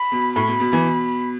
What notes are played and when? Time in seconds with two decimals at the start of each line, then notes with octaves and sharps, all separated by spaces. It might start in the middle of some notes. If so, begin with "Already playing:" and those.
Already playing: B5
0.12 B2
0.35 A2 B5
0.48 B2
0.60 B2
0.72 B2 E3
0.84 B2